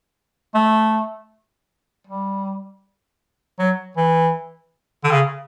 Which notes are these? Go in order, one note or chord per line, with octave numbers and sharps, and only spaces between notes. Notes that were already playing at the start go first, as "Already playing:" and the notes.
A3
G3
F#3
E3
D3
C#3